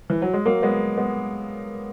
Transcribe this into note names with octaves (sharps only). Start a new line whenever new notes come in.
E3
F#3
G#3
F#3 A#3
G#3 B3
G#3 B3